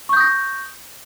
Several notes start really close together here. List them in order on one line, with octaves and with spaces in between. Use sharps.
C#6 G6 D#6 A#6